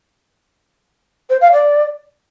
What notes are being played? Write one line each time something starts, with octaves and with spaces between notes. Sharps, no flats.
C5
F5
D5